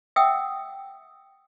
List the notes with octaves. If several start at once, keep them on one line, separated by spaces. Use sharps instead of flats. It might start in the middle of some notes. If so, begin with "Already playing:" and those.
E5 F#5 G5 D#6 E6